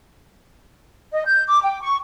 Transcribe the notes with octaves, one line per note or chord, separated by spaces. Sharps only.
D#5
G6
D6
G5
C#6